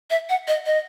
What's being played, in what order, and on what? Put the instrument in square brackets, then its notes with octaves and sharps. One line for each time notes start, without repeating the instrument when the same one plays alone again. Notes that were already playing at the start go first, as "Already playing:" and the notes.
[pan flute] E5
F#5
D#5
D#5